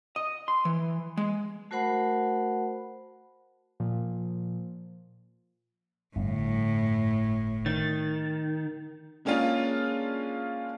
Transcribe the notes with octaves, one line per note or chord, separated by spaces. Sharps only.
D#5
C6
E3
G#3
A3 F#4 A#4 C5 F#5 B5
A#2 F3
G1 A2
D#3 A6
G#3 A#3 C#4 D4 F4 G#4